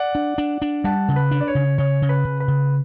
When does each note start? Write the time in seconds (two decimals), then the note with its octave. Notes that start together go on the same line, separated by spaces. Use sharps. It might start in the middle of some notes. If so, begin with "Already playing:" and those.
Already playing: D5 F#5
0.15 D4
0.38 D4
0.62 D4
0.84 G3 F#5 A5
1.08 C#3
1.16 B4
1.31 D4
1.41 D5
1.48 C#5
1.55 C#3
1.78 C#3 C#5
2.02 C#3
2.09 B4
2.24 C#3
2.40 B4
2.48 C#3